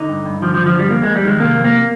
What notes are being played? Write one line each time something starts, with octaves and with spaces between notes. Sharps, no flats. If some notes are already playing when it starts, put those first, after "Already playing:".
Already playing: D3 D#4
G2
G2
D3 F3
F3
D3
F3
G2 G3
F2 A#3
F2 G#3
G3
D#3 G#3
C3 A#3
F2
A#3